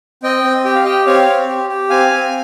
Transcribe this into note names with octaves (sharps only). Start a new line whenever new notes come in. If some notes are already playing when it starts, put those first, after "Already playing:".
C4 D#5 G5
C4
G4 G5
F5
G4 D#5 G5
C4 C#5 F5
C4
G4
G4
C4 F5 G#5
C4